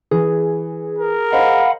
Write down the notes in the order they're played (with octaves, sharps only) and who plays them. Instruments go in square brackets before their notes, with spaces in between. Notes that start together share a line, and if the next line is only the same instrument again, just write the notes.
[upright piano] E3 [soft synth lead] G#4
[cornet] A#4
[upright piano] C5 D#5 [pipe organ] F5 F#5 B5